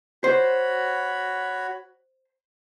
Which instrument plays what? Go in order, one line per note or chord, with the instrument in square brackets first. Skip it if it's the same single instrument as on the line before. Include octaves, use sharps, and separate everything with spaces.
[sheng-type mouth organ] F#4 C#5 B5 [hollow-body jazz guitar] C5